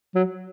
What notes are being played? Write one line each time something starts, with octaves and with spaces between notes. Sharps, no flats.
F#3